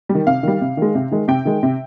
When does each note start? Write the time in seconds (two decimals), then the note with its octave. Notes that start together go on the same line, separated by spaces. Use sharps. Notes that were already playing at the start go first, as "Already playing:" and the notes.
0.09 G3
0.15 D#3
0.27 C3 F5
0.43 D#3 G3
0.61 C3
0.77 D#3 G#3
0.95 C3
1.11 D#3 G#3
1.28 C3 G5
1.45 D#3 G#3
1.63 C3